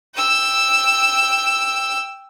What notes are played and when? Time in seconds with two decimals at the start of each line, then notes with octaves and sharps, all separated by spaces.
0.15 G5 E6